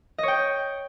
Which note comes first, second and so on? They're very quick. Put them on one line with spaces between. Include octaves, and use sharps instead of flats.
D#5 C#5 G5